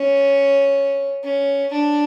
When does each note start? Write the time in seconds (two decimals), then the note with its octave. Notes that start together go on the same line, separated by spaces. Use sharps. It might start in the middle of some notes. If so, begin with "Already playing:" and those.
Already playing: C#4
1.23 C#4
1.72 D4